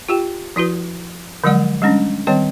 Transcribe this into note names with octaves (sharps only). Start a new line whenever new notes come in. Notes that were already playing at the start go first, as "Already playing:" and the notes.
F4 G4 G5
F3 E4 F#4 B4
D3 F3 F#3 G#3 D5 F#5
G3 G#3 C#4 D4
D#3 G3 C4 C#5 G5